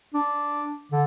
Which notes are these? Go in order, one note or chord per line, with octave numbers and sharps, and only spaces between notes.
D4
D3